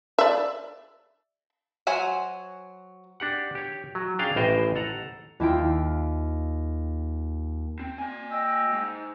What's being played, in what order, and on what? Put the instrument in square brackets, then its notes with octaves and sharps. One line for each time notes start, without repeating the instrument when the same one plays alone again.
[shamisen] D5 E5
[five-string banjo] F#3 F#4 C5 G#5
[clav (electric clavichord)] D4 G4 F#5
G4 C#5
F#3
C#4 D4 G#4 F5 G5
A1 A2 C5 D#5 G5 G#5
A4 F#5 A#5
[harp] D#2 E4 F4 G5 F6
[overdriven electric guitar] C4
A#3 G#5
[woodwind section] D#5 G5 E6
[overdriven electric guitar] G#2